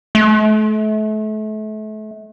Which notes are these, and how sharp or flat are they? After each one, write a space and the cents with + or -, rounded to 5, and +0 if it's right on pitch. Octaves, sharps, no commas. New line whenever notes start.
A3 -35